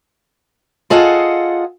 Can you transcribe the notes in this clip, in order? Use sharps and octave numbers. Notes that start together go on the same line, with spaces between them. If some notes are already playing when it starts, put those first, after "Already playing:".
F4 G#4 A4 D#5 F5 F#5